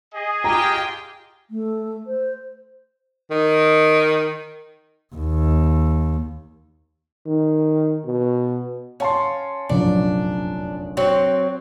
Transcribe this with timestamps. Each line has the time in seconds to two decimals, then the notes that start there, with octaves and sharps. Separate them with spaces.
0.14 G#4 D#5
0.44 F4 G4 G5 A#5
1.50 A3
2.06 C5
3.31 D#3
5.15 D#2
7.27 D#3
8.05 B2
9.00 C#4 F5 A5 C6
9.69 F1 A#1 F#2 D4
10.97 F#3 C4